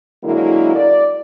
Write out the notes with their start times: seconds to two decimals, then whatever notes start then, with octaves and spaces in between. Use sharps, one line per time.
0.24 D3 F#3 G#3 A#3 E4
0.76 D5